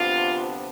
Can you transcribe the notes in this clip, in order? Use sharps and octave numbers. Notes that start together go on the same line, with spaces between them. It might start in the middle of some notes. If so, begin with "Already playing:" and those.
Already playing: D2 C3 F3 B3 D4 F4